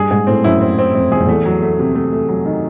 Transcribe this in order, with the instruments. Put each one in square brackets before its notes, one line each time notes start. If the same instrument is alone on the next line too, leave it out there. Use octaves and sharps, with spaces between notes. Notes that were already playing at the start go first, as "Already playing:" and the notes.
Already playing: [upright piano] G2 [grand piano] G#4
[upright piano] G#2 [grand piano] G#4
[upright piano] A2 [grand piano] C4
[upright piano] F#2 [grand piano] E4
[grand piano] C4
C4
[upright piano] F2 [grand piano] C4
[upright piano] E2 [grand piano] G#4
[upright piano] F2
[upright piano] E2 [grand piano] A3
[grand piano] F#3
A3
C3
A3
A3
F#3
D#3